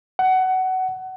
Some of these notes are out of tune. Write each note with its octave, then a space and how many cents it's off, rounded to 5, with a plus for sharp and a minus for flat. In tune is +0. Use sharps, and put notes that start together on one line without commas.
F#5 +20